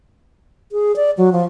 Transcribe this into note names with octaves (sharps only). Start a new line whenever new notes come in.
G#4
D5
F#3
F3